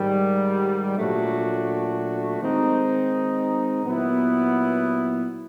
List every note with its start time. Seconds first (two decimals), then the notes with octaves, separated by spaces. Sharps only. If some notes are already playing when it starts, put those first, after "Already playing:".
Already playing: G#2 D#3 G3
0.97 A#2 F#3 A3 D4 F#4
2.40 D#3 G#3 C4 D#4
3.83 A#2 F#3 B3 E4